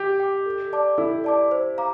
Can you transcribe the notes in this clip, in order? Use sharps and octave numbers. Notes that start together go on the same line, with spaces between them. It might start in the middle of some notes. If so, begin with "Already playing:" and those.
Already playing: G4
G5 D6
A4
D5 A5 D6
E4 A4
D5 A5 D6
C5
F5 A#5 D6